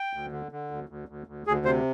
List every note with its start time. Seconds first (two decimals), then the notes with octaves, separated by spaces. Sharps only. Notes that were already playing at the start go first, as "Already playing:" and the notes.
Already playing: G5
0.13 D2
0.32 D3
0.52 D3
0.71 D2
0.89 D2
1.08 D2
1.27 D2
1.47 D2 G#4
1.65 C3 C5